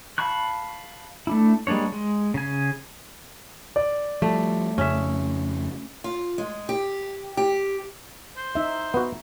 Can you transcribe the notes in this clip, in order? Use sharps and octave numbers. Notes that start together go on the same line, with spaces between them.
F5 A5 B5 C#6 F#6
A3 D4 E4
G3 G#3 A#3 D4 C#5
G#3
C#3 G#5
D5
F3 G3 A3
F2 C#3 C#4 E5
F4
G#3
G4
G4
C5
D#4 E5
B3 F#4